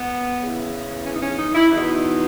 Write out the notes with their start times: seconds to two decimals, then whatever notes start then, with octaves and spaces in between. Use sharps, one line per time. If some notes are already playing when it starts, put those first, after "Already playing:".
Already playing: B3
0.42 E2 C#3 E3
1.07 C#4
1.15 D#4
1.23 C#4
1.39 D#4
1.55 E4
1.71 E2 B2 D#4